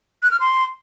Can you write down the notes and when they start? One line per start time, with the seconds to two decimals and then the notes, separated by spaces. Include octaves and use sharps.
0.23 F#6
0.31 F6
0.40 C6